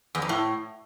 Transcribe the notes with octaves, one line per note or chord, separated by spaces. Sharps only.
E2
F2
A2